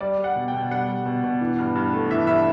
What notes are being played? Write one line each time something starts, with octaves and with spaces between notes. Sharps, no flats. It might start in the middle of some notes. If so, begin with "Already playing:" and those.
G3 D5
G3
F#5
B2
G5
B2
G3 F#5
G3
B2
B2
E3
G2
G2
A3
E3 E5
G2 E5